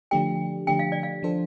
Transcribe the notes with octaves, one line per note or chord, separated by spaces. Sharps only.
D3 F3 A3 D4 G4 G5
D3 F3 A3 D4 G4 G5
F5
D5
F5
F3 D4 A4 C5